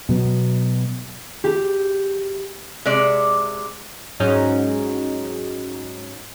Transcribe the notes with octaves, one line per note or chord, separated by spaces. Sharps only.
B2 F#3 B3
G4
C3 G#3 D5
G#2 F#3 C#4 D#4